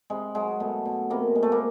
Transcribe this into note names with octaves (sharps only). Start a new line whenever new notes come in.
C3 G#3
F#3 G#3
B2 A3
B2
C3 A#3
G#3
A3
A#3